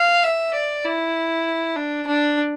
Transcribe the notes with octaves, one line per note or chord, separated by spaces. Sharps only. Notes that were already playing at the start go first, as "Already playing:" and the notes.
Already playing: F5
E5
D5
E4
D4
D4